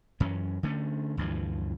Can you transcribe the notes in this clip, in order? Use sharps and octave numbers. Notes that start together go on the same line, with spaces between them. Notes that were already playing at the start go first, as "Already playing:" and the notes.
F#2 E3 C#4
D3 A3 C#4
D2 G2 E3 F3